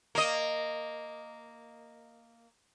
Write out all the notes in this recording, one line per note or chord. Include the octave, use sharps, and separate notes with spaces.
A#3 D#5